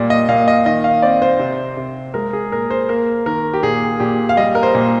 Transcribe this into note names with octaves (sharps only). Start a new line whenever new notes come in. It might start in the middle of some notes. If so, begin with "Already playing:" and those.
Already playing: A#2 G3 D5
D#5
A#2 F5
D#5
D#3 D#5
F5
C4 D5
C5
C3
C3
G#3 A#4
G#4
A#2 A#4
C5
A#3 A#4
D#3 A#4
G4
A#2 G#4
A#2 G4
F5
G3 D#5
A#4
C5
A#2